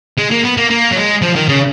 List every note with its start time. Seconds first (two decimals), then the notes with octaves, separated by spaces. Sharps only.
0.18 G#3
0.31 A#3
0.44 B3
0.57 A#3
0.70 A#3
0.92 F#3
0.97 G#3
1.22 F3
1.36 D#3
1.49 C#3